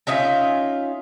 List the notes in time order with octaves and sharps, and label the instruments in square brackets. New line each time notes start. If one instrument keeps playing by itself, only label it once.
[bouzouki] C#4 D#4 F4 E5